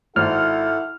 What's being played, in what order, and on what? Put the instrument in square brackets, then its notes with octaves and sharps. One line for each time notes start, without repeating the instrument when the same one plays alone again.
[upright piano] G#1 [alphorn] E4 [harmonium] A4 F#5 [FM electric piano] F6